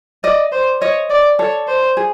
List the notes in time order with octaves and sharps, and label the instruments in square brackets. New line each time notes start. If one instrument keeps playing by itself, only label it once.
[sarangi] D5 [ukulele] D#5
[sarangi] C5
[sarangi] C#5 [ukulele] D#5
[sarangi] D5
[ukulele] A4 [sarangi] C#5
[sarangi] C5
[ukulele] G#4